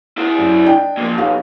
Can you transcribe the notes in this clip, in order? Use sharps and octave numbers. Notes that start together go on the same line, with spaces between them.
E4 D5
F#2
D4 D#5 G5
A#2 F3
B1 G4 F5